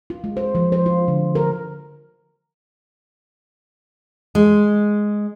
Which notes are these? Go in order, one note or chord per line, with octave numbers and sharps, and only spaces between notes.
F4
G#3
C5
F3
C5
F4
D3
A#4
G#3